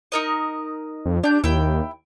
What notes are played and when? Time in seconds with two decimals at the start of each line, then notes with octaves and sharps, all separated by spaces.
0.12 D#4 A#4 D#5
1.06 F2
1.24 D4 G4 G6
1.44 D#2 E4 G5